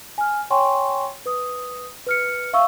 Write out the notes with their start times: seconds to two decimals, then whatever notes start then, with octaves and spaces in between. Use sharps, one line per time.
0.18 G#5 F6
0.50 C#5 G5 G#5 C6 C#6
1.26 B4 D#6
2.07 B4 F6 C#7
2.53 E5 F5 C#6 E6